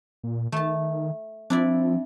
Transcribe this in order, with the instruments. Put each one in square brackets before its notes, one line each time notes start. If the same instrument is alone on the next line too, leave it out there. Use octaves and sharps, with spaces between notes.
[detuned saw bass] A#2
[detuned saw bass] D#3 [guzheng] A3 A5
[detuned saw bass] F3 [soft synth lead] C4 [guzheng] D4 E4 D5